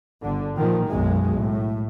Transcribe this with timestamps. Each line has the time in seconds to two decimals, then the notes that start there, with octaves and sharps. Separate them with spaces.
0.23 G1 D3
0.56 A#2 D#3 F3
0.88 B1 F#2 G#3
1.38 A2